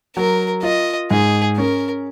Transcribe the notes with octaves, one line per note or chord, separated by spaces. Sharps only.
F#3 A#4
F4 D#5
G#2 G#4
C#4 A#4